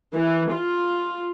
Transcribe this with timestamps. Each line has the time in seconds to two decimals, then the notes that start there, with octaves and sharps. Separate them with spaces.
0.16 E3
0.54 F4